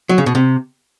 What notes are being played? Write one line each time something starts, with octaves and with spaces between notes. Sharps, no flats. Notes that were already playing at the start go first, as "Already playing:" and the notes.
F#3
C#3
B2
C3